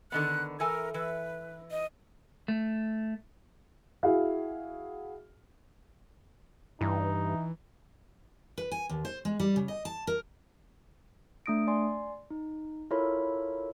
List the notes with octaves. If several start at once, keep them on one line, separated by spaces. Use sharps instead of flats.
D3 D#3 B3 F#6
E3 A4 A#4 G#5
E3 B4
D#5
A3
E4 F#4 G#4 F5
G2 E3 D#4
B4
G#5
D#2
C5
G#3
G3
C#3
D#5
A5
A#4
A3 D4 D#6 A#6 D7
D5 G#5 C6
D#4
E4 F4 A4 A#4 C#5 B5